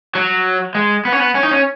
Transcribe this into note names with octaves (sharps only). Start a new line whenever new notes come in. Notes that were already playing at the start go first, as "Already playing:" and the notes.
F#3
G#3
B3
C#4
B3
C#4
D#4
C#4